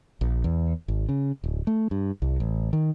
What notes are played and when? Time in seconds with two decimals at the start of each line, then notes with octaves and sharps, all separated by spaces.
0.21 A#1
0.44 E2
0.88 G#1
1.09 C#3
1.44 D1
1.67 A3
1.91 G2
2.22 C2
2.40 A1
2.73 D#3